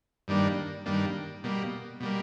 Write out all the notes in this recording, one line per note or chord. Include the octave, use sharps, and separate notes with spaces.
G2 D#3 G3 A#3 D4
G2 D#3 G3 A#3 D4
B2 G3 A#3
B2 G3 A#3